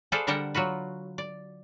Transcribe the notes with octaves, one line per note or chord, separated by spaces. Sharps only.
G#4 A4 B4 C5 D5 F5
D3 G3 A#4 F#5 G5 A5
F#3 F4 F#4 B4
D5